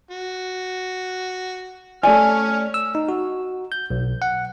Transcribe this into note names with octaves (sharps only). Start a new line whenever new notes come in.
F#4
A3 C#4 D5 G#5 F6
E6
D#4
F#4
G6
B1
F#5